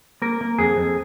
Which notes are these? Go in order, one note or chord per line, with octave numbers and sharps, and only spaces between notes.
A#3 A#4
A#3
F2 G#4
F2